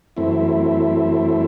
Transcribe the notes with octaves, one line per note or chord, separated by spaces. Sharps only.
F#2 E3 A3 C4 E4